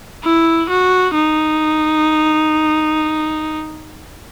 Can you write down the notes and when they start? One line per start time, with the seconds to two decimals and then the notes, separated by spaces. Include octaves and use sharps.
0.24 E4
0.69 F#4
1.14 D#4